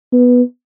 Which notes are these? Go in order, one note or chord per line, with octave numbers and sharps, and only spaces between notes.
B3